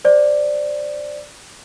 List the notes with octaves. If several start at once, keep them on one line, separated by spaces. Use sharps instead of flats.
C5 D5